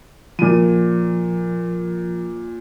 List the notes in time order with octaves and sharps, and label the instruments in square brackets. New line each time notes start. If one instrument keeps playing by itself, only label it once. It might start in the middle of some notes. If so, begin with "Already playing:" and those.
[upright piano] A#2 D#7 [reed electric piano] F3